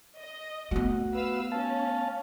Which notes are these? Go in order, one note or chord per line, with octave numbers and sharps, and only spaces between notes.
D#5
A3 B3 F#4
B4 F5 E6
C#4 F5 A5